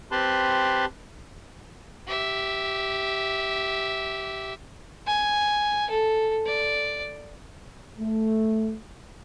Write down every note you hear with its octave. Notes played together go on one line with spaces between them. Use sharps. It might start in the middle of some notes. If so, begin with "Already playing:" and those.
C4 G4 B4 A5 B5 C6
G4 E5
G#5
A4
D5
A3